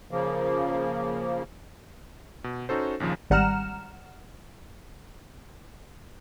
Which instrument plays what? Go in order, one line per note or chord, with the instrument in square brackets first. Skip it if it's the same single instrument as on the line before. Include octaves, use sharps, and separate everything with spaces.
[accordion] C#3 F3 A#3
[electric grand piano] B2
C#4 D#4 F#4 A4 C5
A#1 D#2 C#3 F3
[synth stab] G#1 G3 F#5 A#5 F6 E7